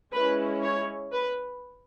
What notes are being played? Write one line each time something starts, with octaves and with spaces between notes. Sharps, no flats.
G#3 C#4 E4 B4
C#5
B4